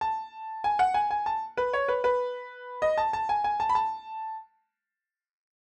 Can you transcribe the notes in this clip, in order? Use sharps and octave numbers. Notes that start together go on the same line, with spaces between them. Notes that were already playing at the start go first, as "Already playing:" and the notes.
A5
G#5
F#5
G#5
G#5
A5
B4
C#5
B4
B4
D#5
A5
A5
G#5
G#5
A5
B5
A5